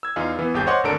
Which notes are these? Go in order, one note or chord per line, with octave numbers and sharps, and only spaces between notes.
E6 G#6
E2 D#4 F4 G#4
E3 B3
G1 D#2 G4 G#4 G6
C5 C#5 D#5 F#5 C6 D6
G#1 D2 D3 A4 A#4 D7